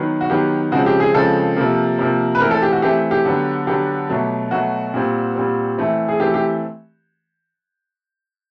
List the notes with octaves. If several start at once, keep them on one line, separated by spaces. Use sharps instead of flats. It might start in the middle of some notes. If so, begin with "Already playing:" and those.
Already playing: D#3 F#3 B3
F#4
D#3 F#3 B3 G4
C#3 F3 G#3 C4 F#4
G4
G#4
C#3 F3 G#3 C4 A4
C3 F3 A#3
C3 F3 A#3
B4
E3 A3 C4 A#4
A4
G4
F#4
E3 A3 C4 G4
G4
D3 F#3 B3
D3 F#3 B3 G4
B2 F#3 A3
B2 F#3 A3 F#4
A#2 G3 C4
A#2 G3 C4
E3 A3 C4
G#4
E3 A3 C4 G4
G4